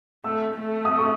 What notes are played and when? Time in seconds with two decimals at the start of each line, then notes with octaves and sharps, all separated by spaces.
0.24 A3 E6
0.54 A3
0.85 D#6
0.98 C#6